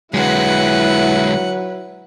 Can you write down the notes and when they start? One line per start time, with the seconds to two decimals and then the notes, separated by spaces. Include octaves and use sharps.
0.14 D3 F#3 G#3 E4 B4 F#5